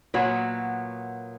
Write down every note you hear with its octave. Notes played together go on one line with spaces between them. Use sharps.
A#2 F#3 B3 F#4